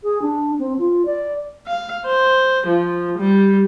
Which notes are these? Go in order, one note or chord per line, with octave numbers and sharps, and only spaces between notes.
G#4
D4
C4
F4
D5
F5
C5
F3
G3